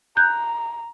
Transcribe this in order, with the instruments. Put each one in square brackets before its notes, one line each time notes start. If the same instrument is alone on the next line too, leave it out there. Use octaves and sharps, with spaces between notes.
[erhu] A#5 [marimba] F#6 G6